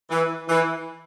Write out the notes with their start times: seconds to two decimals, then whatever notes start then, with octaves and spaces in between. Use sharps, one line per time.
0.10 E3
0.49 E3